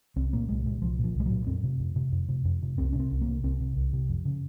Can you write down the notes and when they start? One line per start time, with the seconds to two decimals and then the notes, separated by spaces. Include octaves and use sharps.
0.16 C2 C4
0.33 A#2 A#3
0.49 C2 G#3
0.65 A#2 G#3
0.81 C2 F3
0.99 A#2
1.04 F3
1.15 C2 G#3
1.26 A#2 F#3
1.47 F2 C4
1.64 C3
1.80 F2
1.96 C3
2.12 F2
2.29 C3
2.45 F2
2.62 C3
2.78 C2 C4
2.93 C#4
2.95 C3 C4
3.11 C2
3.21 A#3
3.27 C3
3.43 C2 C4
3.61 C3
3.76 C2
3.93 C3
4.09 F2
4.25 C#3